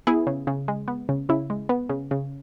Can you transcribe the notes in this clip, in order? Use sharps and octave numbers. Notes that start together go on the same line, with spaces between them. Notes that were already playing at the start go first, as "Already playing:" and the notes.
B3 E4 G#4
C#3
C#3
G#3
B3
C#3
C#3 E4
G#3
B3
C#3
C#3